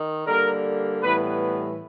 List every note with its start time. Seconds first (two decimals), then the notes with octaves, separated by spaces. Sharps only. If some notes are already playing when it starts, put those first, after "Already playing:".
Already playing: D#3
0.27 D3 G3 A#3 A#4
1.03 A2 E3 G3 B3 B4